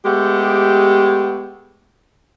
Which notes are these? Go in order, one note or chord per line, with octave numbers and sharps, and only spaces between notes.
G#3 A3 B3 G4